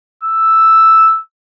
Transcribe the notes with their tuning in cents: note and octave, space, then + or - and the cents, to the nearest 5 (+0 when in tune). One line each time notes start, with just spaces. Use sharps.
E6 +0